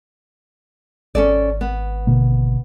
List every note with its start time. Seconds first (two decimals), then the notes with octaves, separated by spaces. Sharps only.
1.15 G#1 C#4 A4 D5
1.61 B3
2.07 B2 D3 A#3